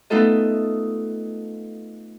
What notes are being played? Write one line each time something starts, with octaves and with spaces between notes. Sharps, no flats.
A3 B3 D#4 F4 A4 D#5